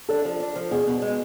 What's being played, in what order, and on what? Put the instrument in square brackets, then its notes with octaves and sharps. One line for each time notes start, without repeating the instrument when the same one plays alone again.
[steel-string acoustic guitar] D4 [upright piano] A4
[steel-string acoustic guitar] F3
D4
F3
[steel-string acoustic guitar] B2 [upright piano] G#4
[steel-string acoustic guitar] B2
G#3